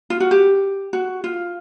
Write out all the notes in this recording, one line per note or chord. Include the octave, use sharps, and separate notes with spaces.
F4
F#4
G4
F#4
F4